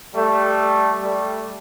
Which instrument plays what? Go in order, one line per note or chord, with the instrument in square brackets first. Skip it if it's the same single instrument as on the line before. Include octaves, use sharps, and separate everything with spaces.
[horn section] G3 A3
G3 A3